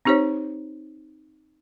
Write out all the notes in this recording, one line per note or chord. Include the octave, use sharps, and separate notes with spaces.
C4 D#4 G4 C5 C#5